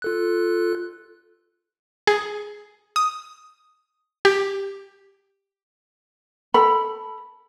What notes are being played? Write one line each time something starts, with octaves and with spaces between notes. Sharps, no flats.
F4 A4 F#6
G#4
D#6
G4
A4 B5